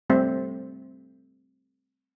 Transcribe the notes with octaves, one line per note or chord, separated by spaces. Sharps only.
G3 A3 C4 C5 E5